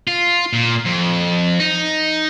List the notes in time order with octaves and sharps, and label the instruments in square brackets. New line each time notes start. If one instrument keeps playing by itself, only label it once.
[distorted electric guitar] F4
A#2
F2
D#4